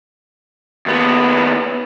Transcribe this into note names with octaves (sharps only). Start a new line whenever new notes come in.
D#2 B3